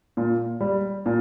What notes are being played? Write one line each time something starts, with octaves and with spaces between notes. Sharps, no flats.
A#2
G3
A#2